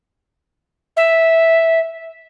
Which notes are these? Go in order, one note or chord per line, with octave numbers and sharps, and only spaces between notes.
E5